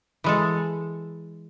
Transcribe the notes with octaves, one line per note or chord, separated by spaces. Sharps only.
E3 G#3 A4